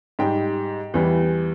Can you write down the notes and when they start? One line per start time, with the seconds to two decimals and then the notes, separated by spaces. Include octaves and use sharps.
0.19 G#2 G3 G5
0.94 E2 E3 G3